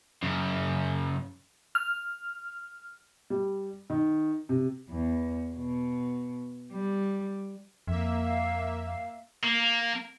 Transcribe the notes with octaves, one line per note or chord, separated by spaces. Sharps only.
F#2 C#3
F6
G3
D#3
C3
E2
B2
G3
F2 A#3 E5
F5
F5
A#3